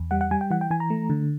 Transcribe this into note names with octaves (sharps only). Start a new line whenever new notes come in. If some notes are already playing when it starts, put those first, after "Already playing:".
Already playing: E2
G3 F#5
F#5
G3 G#5
G5
E3 F#5
G5
E3 G#5
A#5
A3
D3